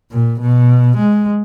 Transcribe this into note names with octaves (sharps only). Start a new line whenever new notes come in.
A#2
B2
G#3